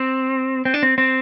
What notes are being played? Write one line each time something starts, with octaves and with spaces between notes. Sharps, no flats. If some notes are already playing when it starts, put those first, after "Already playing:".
Already playing: C4
C4
D4
C4
C4